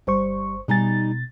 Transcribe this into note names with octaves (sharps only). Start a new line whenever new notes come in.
G1 G3 C5 C#6
B2 G3 D#4 G#5 A6